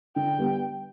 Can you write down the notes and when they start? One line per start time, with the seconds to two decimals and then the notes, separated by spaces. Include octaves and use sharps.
0.16 D3 G5
0.38 G3 B3